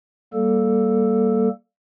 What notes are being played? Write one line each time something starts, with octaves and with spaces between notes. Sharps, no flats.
G3 A#3 A4